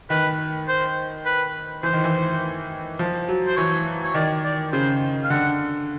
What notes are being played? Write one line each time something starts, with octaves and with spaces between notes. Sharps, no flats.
D#3 B4
C5
B4
E3 C5
D#3
E3
F3
F#3
C5
E3 C#5
C#5
D#3 D5
D5
C#3 C5
F5
D3 F#5